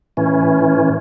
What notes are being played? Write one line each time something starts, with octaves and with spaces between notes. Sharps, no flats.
A2 E3 C#4